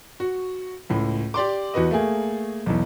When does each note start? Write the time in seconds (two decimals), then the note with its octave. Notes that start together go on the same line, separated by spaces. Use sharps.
0.20 F#4
0.89 C#2 A2
1.34 G4 D5 C6 D6
1.74 E2 F#4 B4 D#5
1.91 A3 A#3 G#4
2.66 B1 E2